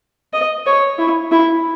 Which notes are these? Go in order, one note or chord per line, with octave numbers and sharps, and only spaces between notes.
D#5
C#5
E4
E4